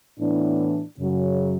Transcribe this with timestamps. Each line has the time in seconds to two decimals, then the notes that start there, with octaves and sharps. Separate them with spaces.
0.19 A2 E3 B3 D4
0.99 F#2 C#3 F#3